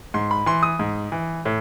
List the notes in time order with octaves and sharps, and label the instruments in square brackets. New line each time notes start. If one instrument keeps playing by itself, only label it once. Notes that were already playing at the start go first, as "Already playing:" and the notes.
[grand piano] G#2 C6
B5
E3 C6
D#6
G#2
E3
A2